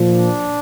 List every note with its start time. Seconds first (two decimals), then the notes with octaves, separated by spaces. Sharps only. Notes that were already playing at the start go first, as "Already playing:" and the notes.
Already playing: A#2 F3
0.11 D4